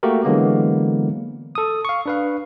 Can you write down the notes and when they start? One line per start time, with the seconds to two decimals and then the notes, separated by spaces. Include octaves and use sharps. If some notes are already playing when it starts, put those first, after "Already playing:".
0.03 A3 A#3 F#4 G4 A#4
0.24 D3 E3 F#3 G#3 A#3 B3
1.55 A4 D#6
1.85 F5 C#6
2.06 D4 B4 F5